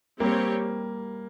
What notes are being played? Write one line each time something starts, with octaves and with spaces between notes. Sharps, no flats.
G3 A#3 C4 G4 C#5